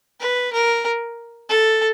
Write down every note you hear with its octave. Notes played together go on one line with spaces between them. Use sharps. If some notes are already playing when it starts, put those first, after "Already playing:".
B4
A#4
A4